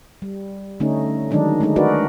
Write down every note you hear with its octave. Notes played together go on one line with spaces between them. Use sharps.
G3
D3 A3 C#4 D#4
D#3 F#3 G#3 D4 D#4
G#3 A3 D4 D#4
D4 D#4 F#4 A#4 B4 D5